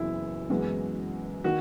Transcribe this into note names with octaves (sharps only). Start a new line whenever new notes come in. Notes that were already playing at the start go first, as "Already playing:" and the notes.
Already playing: F#1 F#2 E3 B3 E4
F#2 E3 G#3 B3 F#4
D#3 F#4